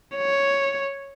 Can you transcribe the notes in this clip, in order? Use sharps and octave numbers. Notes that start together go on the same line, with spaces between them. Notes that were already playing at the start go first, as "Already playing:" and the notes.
C#5